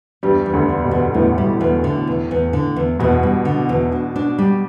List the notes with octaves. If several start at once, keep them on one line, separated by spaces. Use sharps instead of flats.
E2 G2 G3
E2
D2 D3
E2
B2
E2
E2 A2
G3
E2
D3
E2
E2
D3
E2
E2 B2
G3
D3
E2
D4
D4
G3